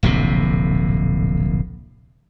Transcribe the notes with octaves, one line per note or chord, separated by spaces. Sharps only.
D1 A#1 A2 C3